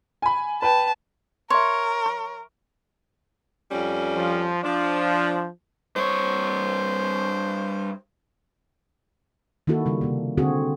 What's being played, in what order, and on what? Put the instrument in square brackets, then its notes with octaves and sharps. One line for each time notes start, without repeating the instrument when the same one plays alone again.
[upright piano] G#5 B5
[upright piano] B4 G5 [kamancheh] A5
[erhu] A#4 [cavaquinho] C#5 [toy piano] E5 C6
[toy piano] C#6
[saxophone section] F2 G3 C#4
[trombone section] F3
[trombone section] F3 [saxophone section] D4
[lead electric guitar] G2 C#5 [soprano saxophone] C5
[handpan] D#3 A#3 E4 F#4 A4
C#3 G3
C3 A#3
D3 C4 F#4 G#4